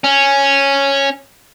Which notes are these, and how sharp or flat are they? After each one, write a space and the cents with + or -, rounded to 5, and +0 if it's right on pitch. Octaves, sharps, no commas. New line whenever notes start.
C#4 -5